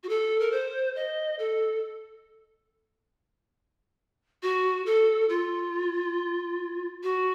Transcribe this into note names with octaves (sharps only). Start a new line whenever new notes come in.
F#4
A4
A#4
C5
D#5
A4
F#4
A4
F4
F#4